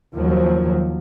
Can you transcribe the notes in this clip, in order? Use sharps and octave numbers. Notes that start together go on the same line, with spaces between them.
D#2 F3 F#3